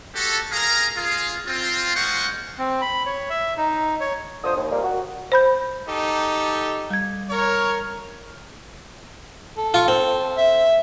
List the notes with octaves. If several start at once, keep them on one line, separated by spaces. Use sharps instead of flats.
F#4 G4 A4
G#4 A#4 F5 A#5
F4 G#4
C4 F4
G#3 F4 C5 F#5 C#6
C4
B5
C#5
E5
D#4
C#5
D3 F3 C5 D#6
D#2
F2 A#2 G3 A#3
F#4
C5 B5 G6
D#4 G4 A4
G3 G#6
A#4 C#5
A4
F4 C#6
C4
E5